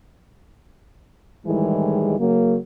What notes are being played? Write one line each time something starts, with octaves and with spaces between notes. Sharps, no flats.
A2 D#3 E3 G3 G#3
C#3 F#3 A#3